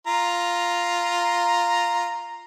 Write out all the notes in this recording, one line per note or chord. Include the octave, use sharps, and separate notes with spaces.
F4 A#5